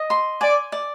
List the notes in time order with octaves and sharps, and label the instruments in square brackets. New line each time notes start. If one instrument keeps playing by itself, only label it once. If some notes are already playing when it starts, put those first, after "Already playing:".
Already playing: [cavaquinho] D#5
C6
[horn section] D5 [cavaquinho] G#5
[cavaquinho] D5